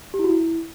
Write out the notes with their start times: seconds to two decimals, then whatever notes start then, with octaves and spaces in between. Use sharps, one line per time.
0.14 G4
0.19 E4
0.24 F#4
0.29 E4